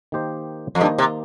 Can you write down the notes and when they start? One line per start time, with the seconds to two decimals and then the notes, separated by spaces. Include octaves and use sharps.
0.12 D#3 A#3 G4 C5 D#5
0.75 F2
0.81 G2 D#3 A#3 G4 C5 D#5
0.98 C3